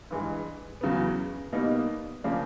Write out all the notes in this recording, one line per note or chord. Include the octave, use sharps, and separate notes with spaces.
G2 E3 G#3
E2 C#3 F#3 B3
B2 G3 A#3 D#4
C#3 F3 A#3 D4